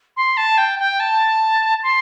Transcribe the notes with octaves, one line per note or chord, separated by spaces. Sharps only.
C6
A5
G5
G5
A5
C6